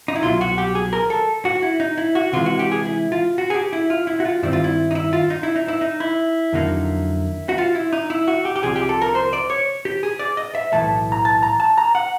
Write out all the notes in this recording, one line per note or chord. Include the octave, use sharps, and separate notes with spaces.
D#4
E4
C2 B2 F#3 F4
F#4
G4
G#4
A#4
A4
F#4
E4
D#4
E4
F#4
C3 E3 G#3 F4
F#4
G4
G#4
E4
F4
F#4
G#4
G4
E4
F4
E4
F#4
F4
G2 D#3 G3 C4 E4
F4
E4
D#4
E4
F4
D#4
E4
D#4
E4
D#4
E4
F2 D3 F#3 A#3 D#4
F#4
F4
E4
D#4
E4
F#4
G4
G4
C2 C3 F3 G#4
G4
A4
A#4
C5
D5
C#5
G4
G#4
D5
D#5
E5
B1 A2 E3 A3 A5
A#5
A5
A#5
A5
A#5
F#5